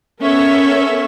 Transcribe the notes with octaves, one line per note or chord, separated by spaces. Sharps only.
B3 C#4 A4 A#4 C#5 E5